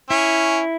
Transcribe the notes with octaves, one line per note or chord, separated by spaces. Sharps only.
C#4 E4